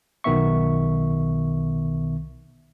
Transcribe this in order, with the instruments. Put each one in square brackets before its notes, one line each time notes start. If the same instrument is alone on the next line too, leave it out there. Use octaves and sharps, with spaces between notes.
[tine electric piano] B1 B2 D#3 B3 E5 C#6